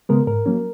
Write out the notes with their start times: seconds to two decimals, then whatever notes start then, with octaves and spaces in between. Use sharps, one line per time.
0.09 C#3 G#3 B3 A#4
0.27 G#2 A#4
0.46 F#3 A#3 C#4